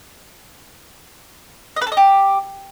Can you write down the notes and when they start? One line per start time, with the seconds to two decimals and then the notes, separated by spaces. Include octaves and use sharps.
1.76 D#5
1.82 B4
1.87 A4
1.92 D#5
1.97 G4